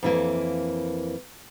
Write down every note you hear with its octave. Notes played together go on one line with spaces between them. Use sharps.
F2 E3 A#3